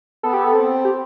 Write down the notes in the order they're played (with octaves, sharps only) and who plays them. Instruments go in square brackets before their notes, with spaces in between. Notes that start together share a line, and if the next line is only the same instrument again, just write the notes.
[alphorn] B3 [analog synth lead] A4
[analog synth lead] G4
A4
[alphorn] C4
[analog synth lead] G4